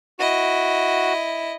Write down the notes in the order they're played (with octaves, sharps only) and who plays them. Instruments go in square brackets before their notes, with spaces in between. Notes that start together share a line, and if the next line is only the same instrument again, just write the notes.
[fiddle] E4 D#5 [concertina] F#4